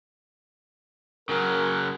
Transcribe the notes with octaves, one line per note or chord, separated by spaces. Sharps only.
C#3 F#3 A#4